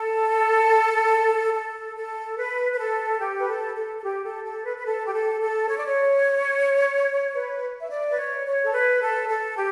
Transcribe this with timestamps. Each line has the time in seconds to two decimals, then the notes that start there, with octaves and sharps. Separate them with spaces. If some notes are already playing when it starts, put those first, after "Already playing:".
Already playing: A4
1.53 A4
1.94 A4
2.36 B4
2.73 B4
2.77 A4
3.19 G4
3.39 B4
3.47 A4
3.74 A4
3.97 A4
4.02 G4
4.23 A4
4.44 A4
4.65 B4
4.76 B4
4.86 A4
5.05 G4
5.13 A4
5.41 A4
5.69 C#5
5.76 D5
5.85 C#5
7.34 B4
7.79 E5
7.90 D5
8.10 B4
8.17 C#5
8.45 C#5
8.64 A4
8.72 B4
9.00 A4
9.28 A4
9.56 G4